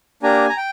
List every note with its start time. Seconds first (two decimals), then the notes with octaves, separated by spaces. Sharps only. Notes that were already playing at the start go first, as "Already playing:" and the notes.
0.23 A#3 D4 G4 G#5 A#5
0.49 A#5
0.57 G5